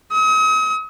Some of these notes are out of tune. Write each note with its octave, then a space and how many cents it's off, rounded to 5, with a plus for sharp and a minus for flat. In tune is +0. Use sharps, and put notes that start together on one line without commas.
D#6 +40